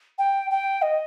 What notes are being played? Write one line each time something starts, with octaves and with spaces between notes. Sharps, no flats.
G5
G5
D#5